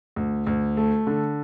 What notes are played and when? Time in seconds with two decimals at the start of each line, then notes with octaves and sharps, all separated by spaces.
0.16 D2
0.47 D2
0.77 A3
1.07 D3